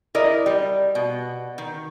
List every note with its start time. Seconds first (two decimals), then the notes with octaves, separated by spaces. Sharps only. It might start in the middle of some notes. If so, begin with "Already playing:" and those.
0.15 E4 A#4 D5 D#5
0.46 G3
0.95 B2
1.58 D#3